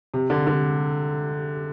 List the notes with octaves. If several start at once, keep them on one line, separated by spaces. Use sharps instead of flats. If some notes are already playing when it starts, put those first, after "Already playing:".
C3
D3
D3